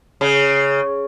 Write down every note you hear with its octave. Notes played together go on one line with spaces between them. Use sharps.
C#3